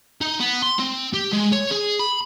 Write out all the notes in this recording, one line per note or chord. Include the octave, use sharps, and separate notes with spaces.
D#4
B3
C6
C4
G4
G#3
C#5
G#4
B5